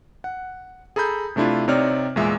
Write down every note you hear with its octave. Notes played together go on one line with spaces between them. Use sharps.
F#5
G#4 A4 A#5 B5 G6
C3 A3 D4 E4 F4
C3 C4 D#4 C#5 D5 F6
E2 A#2 G#3 E5